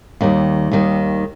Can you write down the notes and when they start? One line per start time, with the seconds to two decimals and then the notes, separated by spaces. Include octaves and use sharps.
0.21 D#2 D#3 G3
0.71 D#2 D#3 G3